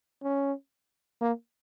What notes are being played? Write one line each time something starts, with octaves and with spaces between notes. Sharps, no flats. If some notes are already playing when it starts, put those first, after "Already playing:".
C#4
A#3